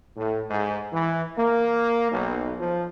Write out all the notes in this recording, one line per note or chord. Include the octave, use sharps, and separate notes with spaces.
A2
G#2
E3
A#3
B1
F3